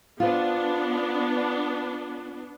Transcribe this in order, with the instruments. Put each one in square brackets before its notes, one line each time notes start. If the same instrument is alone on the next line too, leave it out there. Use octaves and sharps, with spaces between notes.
[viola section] B3 D4 [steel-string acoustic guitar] F4 C5